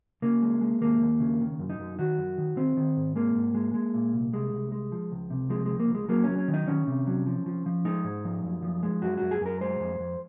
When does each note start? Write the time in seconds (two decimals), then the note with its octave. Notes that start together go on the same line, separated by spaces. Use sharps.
0.22 C#3 A#3
0.43 G#3
0.61 G#3
0.81 D#2 A#3
1.01 D#2
1.20 C#3
1.40 D#3
1.59 F#2
1.70 D#4
1.79 F#2
1.99 D#3 F#4
2.18 F#2
2.38 D#3
2.57 D#3 C4
2.77 D#3
2.97 G#2
3.16 G#3 A#3
3.35 G#2
3.55 G#3
3.74 G#3
3.94 A#2
4.13 C2
4.33 C2 G#3
4.53 C2
4.72 G#3
4.92 F3
5.12 C#2
5.30 C3
5.50 F3 G#3
5.66 C#2 G#3
5.80 A#3
5.89 C#2
5.95 G#3
6.09 F#3 A#3
6.24 C#4
6.29 F#3
6.38 C#4
6.48 D#3
6.54 D#4
6.68 D#3 C#4
6.87 C3
7.07 F#3
7.26 F3
7.46 F3
7.66 F3
7.85 G#3 D#4
8.04 G#2
8.25 F3
8.44 F#2
8.63 F3
8.83 G#3
9.02 F#2 F#4
9.17 F#2 F#4
9.31 G#4
9.41 F#2 A#4
9.61 G#3 C5
9.80 F2
10.00 F2